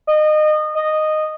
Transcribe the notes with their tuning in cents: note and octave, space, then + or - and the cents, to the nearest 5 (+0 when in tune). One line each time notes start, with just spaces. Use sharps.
D#5 -25
D#5 -10